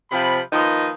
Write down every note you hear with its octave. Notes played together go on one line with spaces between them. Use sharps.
C3 F3 B5
D#3 F3 A#3 D#4 B4 D#5